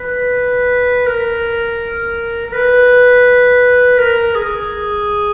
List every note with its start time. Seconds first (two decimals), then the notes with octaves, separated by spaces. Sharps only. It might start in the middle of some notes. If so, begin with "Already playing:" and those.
Already playing: B4
1.06 A#4
2.46 A#4
2.52 B4
3.98 A#4
4.35 G#4